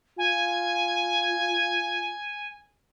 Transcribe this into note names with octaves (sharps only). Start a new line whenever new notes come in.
F4 G#5